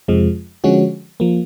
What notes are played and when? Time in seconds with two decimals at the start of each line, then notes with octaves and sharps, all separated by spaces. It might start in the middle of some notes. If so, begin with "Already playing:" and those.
0.08 F2 C3 F3 G#3
0.64 D3 F3 G#3 C#4 F#4
1.20 F3 A#3